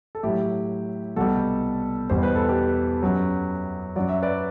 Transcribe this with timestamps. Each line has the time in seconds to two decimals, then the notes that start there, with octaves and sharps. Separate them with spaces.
0.15 A4
0.23 A2 F#3 E4 G4
1.16 C2 B2 G3 F#4 A4
2.10 E2 B2 G3 C5
2.23 B4
2.36 A4
2.48 G4 B4
3.03 F#2 F#3
3.96 F#2 F#3 D5
4.09 E5
4.22 B4 D5